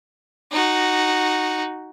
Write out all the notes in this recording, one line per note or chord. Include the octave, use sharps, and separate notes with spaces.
D#4 F#4